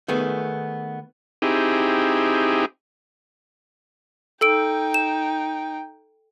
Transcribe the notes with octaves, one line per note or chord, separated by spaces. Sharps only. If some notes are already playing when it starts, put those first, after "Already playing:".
D#3 A3 B3 G#4
C4 D#4 E4 G4 G#4
D#4 A4 G5 E6 D7
E7